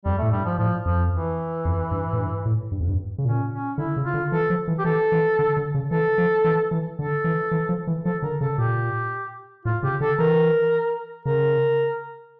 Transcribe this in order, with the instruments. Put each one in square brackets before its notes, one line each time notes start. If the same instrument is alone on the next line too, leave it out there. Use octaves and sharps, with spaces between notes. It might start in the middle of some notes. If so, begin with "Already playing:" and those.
[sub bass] F2 [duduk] G3
[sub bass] A2 [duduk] A3
[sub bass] G2 [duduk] G3
[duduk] F3
[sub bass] A2 [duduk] F3
[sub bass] F2 [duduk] F3
[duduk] E3
[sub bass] F2
G2
A2
G2
A2
G2
F2
G2
C#3
[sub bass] A#2 [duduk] C#4
[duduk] C#4
[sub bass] D3 [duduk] E4
[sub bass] C#3
[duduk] F4
[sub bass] D3
[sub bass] E3 [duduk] A4
[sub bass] F3
E3
[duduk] G4
[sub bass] E3 [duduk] A4
[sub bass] E3
D3
D3
C#3
[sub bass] E3 [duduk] A4
[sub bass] F3
E3
E3
[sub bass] D3 [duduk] A4
[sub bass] E3
E3
F3
E3
[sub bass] F3 [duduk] A4
[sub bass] D3 [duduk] A#4
[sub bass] C#3 [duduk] A4
[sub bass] A#2 [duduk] G4
[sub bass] A2 [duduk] F4
[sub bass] C#3 [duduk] G4
[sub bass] D3 [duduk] A4
[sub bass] E3 [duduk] A#4
[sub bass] C#3 [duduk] A#4